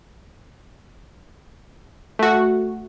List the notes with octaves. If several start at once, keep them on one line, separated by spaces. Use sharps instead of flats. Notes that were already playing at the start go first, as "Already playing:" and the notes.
A3 F#4